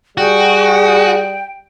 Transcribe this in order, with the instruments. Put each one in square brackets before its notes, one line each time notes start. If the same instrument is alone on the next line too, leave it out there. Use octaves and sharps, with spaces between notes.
[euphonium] G3 [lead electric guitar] F#4 [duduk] G#4 [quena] G5